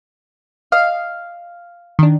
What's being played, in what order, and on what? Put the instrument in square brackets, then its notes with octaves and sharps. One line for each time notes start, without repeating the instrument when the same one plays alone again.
[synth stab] D#5 [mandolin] F5
[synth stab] D#3 D4